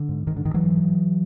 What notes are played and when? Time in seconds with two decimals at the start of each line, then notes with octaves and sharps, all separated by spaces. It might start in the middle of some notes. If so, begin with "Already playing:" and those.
Already playing: D3
0.09 G#2
0.27 G#2 D#3
0.36 D3
0.45 G#2 D#3
0.54 E3 F#3
0.63 G#2